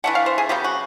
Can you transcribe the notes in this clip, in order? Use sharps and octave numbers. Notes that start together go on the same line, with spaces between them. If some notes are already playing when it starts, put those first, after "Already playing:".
E3 A3 D4 F#5
F5
C5
G#4
C#3 F#3 B3 G4
F#4